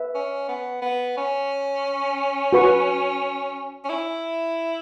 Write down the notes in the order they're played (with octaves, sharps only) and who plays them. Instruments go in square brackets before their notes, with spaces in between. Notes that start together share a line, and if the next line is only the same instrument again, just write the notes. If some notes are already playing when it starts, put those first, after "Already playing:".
Already playing: [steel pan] B4 E5
[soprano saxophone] C#4
B3
B3
C#4
[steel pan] F#4 B4 F#5 C#6
[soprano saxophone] C#4
E4